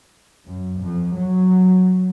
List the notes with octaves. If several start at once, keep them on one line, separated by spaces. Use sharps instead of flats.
F#2
F2
F#3